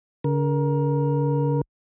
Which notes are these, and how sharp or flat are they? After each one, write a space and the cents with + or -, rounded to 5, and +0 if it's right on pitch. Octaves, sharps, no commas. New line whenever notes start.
D3 -45 A#4 +20